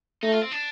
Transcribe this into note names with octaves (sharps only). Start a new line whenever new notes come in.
A3 D#4
F4
C4
D4